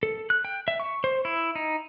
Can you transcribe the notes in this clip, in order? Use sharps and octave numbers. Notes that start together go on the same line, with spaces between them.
A4
F#6
G5
E5
C#6
C5
E4
D#4